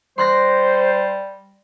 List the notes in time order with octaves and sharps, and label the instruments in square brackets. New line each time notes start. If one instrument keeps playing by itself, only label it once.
[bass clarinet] G3 [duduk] C5 [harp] C6 F#6 A#6